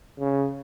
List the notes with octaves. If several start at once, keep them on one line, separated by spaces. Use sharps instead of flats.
C#3